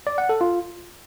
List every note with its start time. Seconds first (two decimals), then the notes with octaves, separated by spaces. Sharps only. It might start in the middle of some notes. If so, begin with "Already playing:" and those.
0.07 D5
0.18 F#5
0.29 A4
0.41 F4